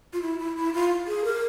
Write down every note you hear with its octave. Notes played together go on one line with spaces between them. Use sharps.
F4
E4
E4
E4
F4
G#4
A#4